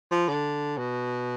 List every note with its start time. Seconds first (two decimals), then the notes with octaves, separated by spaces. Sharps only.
0.11 F3
0.28 D3
0.78 B2